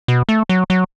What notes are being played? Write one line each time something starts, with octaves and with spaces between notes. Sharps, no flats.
B2
A3
F#3
F#3